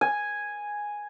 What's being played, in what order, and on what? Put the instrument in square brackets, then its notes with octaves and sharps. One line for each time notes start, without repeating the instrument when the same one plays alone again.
[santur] G#5